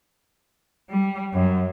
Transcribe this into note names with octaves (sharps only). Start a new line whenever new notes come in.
G3
F#2